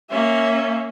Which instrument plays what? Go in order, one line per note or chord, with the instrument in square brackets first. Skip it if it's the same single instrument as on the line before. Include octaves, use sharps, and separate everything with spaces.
[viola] A#3 C#4 [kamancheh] E5